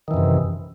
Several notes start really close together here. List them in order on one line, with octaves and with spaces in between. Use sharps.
D#3 E3 F#2 C3